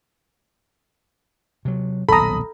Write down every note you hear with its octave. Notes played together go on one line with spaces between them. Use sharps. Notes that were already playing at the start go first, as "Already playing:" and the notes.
C3 F#3
D#1 B1 A4 A#5 B5 D#6